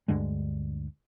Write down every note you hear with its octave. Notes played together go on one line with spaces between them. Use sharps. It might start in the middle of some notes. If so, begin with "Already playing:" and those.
D2 G2 D3 G#3